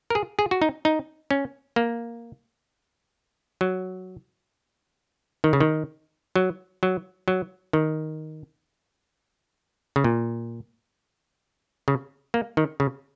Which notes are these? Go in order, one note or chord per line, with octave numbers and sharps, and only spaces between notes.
A#4
G#4
G#4
F#4
D#4
D#4
C#4
A#3
F#3
D#3
C#3
D#3
F#3
F#3
F#3
D#3
C#3
A#2
C#3
A#3
D#3
C#3